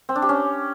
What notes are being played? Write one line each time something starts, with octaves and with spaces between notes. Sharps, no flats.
C4
D4
G4
C#4